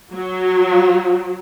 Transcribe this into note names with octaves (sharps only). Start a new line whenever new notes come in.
F#3